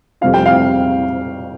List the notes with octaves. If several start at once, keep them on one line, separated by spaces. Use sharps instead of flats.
F2 C3 G3 C4 F5
G5
F5